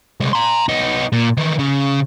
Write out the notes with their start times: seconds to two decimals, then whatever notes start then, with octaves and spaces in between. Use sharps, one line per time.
0.20 C2 G#3
0.33 A#5 C6
0.69 B3 D#4
1.12 A#2
1.37 D#3 E3
1.59 C#3